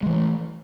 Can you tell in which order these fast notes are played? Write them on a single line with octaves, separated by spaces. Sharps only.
G#3 E3 A3